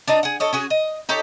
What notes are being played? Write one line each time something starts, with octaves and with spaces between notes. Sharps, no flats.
D4 D5 D#5 A#5
G#4 F#5
A4 C#5 D#5
C#4 F#4 G#4
D#5
D#4 G4 A4 C#5